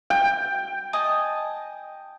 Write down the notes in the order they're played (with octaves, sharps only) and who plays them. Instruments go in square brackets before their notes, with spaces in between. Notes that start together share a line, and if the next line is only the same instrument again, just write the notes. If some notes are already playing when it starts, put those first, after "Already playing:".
[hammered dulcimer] G5
[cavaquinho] D#5 G#5 A5